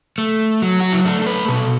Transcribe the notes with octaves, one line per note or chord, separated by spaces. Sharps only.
A3
F#3
F#4
E4
A3 D4
A4
B4
B2 A4